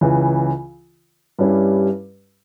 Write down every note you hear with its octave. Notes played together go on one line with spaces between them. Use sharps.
C#2 C#3 E3
G2 G3 C#4 E4 G4